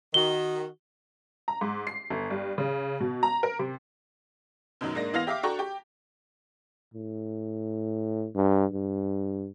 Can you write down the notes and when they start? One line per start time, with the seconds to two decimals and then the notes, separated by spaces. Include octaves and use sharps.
0.14 D#3 F#4 G7
1.48 A#5
1.61 G#2
1.87 C7
2.10 G1
2.30 G2
2.58 C#3
3.00 B2
3.23 A#5
3.43 A#4
3.59 C3
4.81 F#2 B2 D#3 F#3
4.95 G#2 A#3 D4 A#6
5.14 E3 B3 F5 C6 A#6 F7
5.27 G4 E5 F5 D6
5.43 D4 F#4 A4 G5 A#5 C#6
5.59 G4
6.94 A2
8.35 G2
8.73 G2